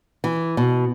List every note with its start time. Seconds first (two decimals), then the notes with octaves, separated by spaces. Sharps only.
0.24 E3
0.57 B2